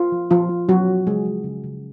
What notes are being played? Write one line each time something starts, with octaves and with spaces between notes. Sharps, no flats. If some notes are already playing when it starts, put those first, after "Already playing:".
Already playing: F4
F3
F3 F4
F3
F#3 C#4 F#4
F3
C#3 G#3 G#4
F3
C#3
C#3